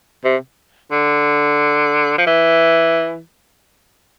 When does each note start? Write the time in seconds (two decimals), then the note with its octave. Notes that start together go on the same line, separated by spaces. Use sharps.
0.25 C3
0.92 D3
2.18 F3
2.27 E3